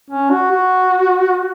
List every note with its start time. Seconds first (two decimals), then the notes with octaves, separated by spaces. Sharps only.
0.11 C#4
0.31 F#4
0.51 F#4